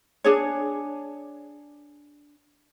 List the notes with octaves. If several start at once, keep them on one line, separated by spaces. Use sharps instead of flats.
D4 G#4 C#5